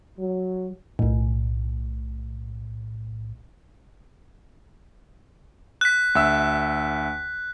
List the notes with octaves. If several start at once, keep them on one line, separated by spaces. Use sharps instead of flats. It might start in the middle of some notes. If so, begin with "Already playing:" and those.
F#3
B1 A2
F#6 B6
D2 E5 E6